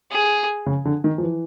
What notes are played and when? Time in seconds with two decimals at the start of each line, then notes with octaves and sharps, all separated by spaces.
0.11 G#4
0.66 C#3
0.85 D3
1.04 D#3
1.18 F3
1.23 E3